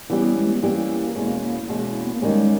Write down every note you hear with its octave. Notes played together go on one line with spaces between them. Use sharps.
E3 G3 B3 C#4 G4
G#3
B3
E3 G3 A#3 C#4 G4
E2 B2 G#3 C#4
E2 B2 G#3 A#3 C#4
B3
A#3
D#2 D#3 G3 G#3 C#4